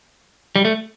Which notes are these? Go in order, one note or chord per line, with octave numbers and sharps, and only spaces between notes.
G3
A3